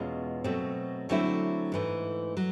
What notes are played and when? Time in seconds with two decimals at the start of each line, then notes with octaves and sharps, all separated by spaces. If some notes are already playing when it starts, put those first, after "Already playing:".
Already playing: E2 B2 G#3 C#4 F4
0.44 B2 F#3 A3 C4
1.09 D3 F#3 A3 C4 E4
1.72 G#2 E3 A3
2.37 F#3